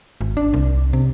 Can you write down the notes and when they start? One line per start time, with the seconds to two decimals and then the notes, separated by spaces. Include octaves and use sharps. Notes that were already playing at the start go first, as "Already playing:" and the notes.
0.21 G#1
0.37 D4
0.53 C2
0.93 C3